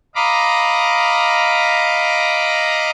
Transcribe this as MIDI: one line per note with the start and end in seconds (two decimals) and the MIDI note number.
0.16 2.91 75
0.16 2.91 77
0.16 2.91 82
0.16 2.91 83
0.16 2.91 86